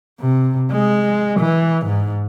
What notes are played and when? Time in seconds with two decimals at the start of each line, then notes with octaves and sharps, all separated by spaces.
0.20 C3
0.72 G#3
1.40 E3
1.86 G#2